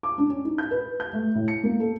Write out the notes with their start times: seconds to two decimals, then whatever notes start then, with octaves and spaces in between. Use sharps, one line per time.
0.03 D6
0.18 D4
0.30 C#4
0.45 D#4
0.58 G6
0.71 B4
1.00 G6
1.13 A3
1.35 A2
1.48 C#7
1.63 A#3
1.80 A4